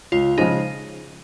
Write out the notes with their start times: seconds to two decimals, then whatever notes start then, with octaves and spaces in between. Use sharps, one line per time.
0.12 C#2 F4
0.38 C#3 F3 G#3 D#4